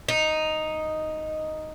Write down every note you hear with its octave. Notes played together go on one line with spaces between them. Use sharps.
D#4